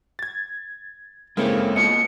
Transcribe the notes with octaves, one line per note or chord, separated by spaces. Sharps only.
G#6 A6
C#3 G#3 A#3 C4 E4 A4 C#5
A#2 B3 D#5 C#7